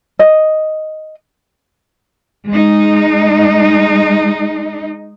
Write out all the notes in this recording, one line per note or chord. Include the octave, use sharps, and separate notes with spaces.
D#5
G#3 D#4